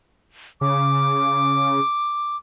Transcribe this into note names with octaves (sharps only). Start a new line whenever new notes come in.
C#3 D6